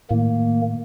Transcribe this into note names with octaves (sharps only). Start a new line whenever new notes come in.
A2 D#3 A#3